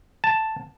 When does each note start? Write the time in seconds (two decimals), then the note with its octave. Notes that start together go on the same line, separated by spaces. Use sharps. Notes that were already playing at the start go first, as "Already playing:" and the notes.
0.24 A5